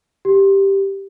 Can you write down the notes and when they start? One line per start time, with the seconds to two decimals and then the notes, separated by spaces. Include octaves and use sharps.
0.25 G4